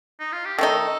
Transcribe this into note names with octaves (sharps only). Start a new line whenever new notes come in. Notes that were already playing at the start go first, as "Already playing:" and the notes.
D#4
F4
G4
D#3 A3 D#4 A4